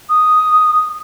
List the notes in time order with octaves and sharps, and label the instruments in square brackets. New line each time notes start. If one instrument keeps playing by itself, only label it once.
[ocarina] D#6